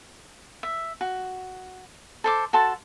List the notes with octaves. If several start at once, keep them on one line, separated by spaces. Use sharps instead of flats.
E5
F#4
A4 C5 D6
F#4 A4 A5 C6